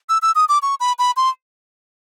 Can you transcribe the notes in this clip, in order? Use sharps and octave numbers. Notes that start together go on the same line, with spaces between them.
E6
E6
D#6
D6
C#6
B5
B5
C6